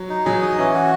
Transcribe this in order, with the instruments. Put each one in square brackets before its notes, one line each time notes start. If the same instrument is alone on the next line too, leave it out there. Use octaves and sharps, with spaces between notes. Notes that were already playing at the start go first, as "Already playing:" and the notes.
Already playing: [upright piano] F#3
[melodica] D#4
[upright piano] F#3 [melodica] G#4
[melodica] D#5
[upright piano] E3 [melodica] C#4
[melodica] F#4